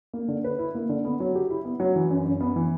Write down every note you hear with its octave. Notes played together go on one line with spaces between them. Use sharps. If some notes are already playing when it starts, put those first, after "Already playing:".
A#3
D3
B4
E4
A#3
D3
B3
F#3
G4
E4
B3
F#3
E3
F#2
F#2
B3
E3